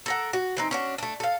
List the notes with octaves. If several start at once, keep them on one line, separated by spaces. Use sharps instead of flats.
A4 A#4 F#5
F#4
E3 C4 D#4
C#4 D4 F#4
A3 D4
A4 F5